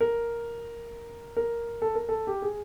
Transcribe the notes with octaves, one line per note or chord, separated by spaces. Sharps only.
A#4
A#4
A4
A#4
A4
G4
G#4